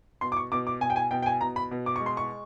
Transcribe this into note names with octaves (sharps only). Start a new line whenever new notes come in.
B2 C6
D6
C#6
B2 D6
D6
B2 G#5
G5
G#5
B2 G5
G5
G#5
B2 A#5
B5
B2
D6
G#3 C#6
C6
C#6